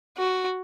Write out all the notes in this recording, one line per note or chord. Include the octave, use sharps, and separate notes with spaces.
F#4